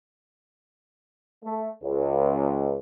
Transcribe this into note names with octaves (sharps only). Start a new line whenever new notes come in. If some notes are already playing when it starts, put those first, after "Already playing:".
A3
C#2